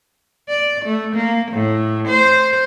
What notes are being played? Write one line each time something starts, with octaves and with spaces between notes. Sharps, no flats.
D5
A3
A#3
A2
C5